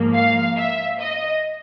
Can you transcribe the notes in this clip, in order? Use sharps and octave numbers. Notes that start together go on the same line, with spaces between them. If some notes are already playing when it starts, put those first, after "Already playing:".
Already playing: G#2 F3 A#3
F5
E5
D#5